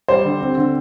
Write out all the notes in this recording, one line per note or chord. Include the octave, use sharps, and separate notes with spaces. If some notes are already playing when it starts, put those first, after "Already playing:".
G3 C5
D3
C4
D3